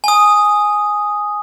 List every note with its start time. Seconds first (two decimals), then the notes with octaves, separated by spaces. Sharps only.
0.04 G#5 D#6